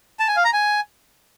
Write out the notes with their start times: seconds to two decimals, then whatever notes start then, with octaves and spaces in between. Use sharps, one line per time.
0.19 A5
0.28 G#5
0.36 F5
0.45 A#5
0.53 G#5